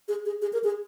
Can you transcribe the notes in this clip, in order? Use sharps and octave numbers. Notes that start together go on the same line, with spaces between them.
G#4
G#4
G#4
A#4
G#4